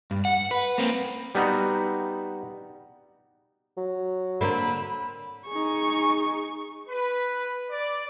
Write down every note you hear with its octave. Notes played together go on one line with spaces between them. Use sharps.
G2
F#5
B4
A#3 C4
G3 B3 D#4 F#4
F#3
D3 A#3 C4 B5
D#4 G#4 C#6
B4
D5